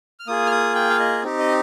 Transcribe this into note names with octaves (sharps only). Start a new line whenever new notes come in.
F6
A#3 F4 G#4 D#6
F6
D#6
G5
F5
D#5
C4 D#4 G4
D#5